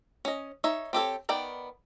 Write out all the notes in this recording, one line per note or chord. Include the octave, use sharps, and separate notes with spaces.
C#4 D#5
D#4 C#5 E5
C4 G4 A4 C#5
D#3 B3 D5 G5